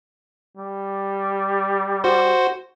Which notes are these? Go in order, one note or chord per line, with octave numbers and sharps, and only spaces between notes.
G3
F#4 C5